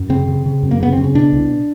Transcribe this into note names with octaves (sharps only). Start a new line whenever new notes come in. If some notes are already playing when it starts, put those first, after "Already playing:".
Already playing: F#2
C#3 C4
C#3
C#3
F#2
A#3
C#3 B3
C#3 C4
C#4
B2 D4
C2